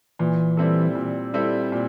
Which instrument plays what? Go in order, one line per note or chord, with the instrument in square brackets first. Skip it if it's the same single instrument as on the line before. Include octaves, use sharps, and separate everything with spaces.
[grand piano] A#2 [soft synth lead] E3
[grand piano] G3 C4 E4 A4
A#2
G3 C4 E4 A4
A#2